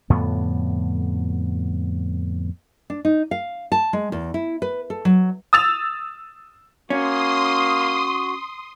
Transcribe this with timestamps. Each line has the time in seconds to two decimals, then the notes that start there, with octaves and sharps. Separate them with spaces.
0.10 F2 A2 D3 B3
2.90 D4
3.05 D#4
3.31 F5
3.72 A5
3.93 G#3
4.12 E2
4.34 E4
4.62 B4
4.90 A4
5.05 F#3
5.53 D#6 E6 A6 F7
6.90 A#3 C#4 F#4 C6 D#6